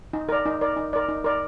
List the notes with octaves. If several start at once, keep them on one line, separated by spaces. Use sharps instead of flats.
D#4
A#4 D5
D#4
A#4 D5
D#4
A#4 D5
D#4
A#4 D5